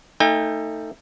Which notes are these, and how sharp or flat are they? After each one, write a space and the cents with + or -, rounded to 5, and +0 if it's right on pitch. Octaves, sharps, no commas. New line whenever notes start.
A3 +25 D#4 +10 G5 +45